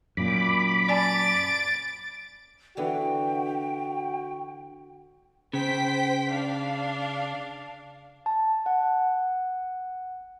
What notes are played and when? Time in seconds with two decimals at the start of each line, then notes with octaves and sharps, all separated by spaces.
0.17 F#2 A#2 B5 D6
0.89 D5 G#5 A5 A6 D7
2.77 D3 E3 B3 F#4 G5
5.53 C#3 C5 G5 B6
6.29 D4 F5
8.26 A5
8.66 F#5